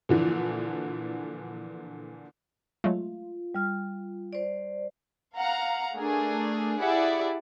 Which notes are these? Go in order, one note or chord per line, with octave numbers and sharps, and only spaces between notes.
A#2 D3 E3 F3
F#3 G#3 A3 F4
G3 F6
C5 D5
F5 F#5 A#5
A3 D4 G#4 A#4
E4 G4 G#4 D5 E5 F#5